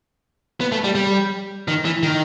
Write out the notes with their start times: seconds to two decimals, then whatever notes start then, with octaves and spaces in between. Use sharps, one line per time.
0.61 B3
0.72 A3
0.84 G3
0.95 G3
1.68 D#3
1.85 E3
2.03 D#3